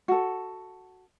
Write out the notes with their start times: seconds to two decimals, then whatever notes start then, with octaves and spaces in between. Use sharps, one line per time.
0.08 F#4 A4